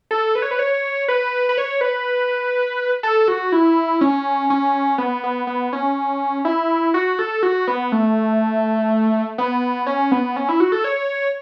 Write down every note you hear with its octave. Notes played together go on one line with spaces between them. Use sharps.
A4
B4
C#5
B4
C#5
B4
B4
C#5
B4
A4
F#4
E4
C#4
C#4
B3
B3
B3
C#4
E4
F#4
A4
F#4
B3
A3
B3
C#4
B3
C#4
E4
F#4
A4
C#5